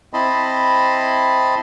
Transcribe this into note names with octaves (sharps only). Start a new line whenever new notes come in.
C4 E4 D#5 A5 B5 C6